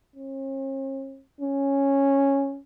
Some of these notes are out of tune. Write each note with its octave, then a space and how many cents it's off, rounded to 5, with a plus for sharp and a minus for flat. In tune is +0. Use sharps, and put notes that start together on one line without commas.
C#4 -45
C#4 -5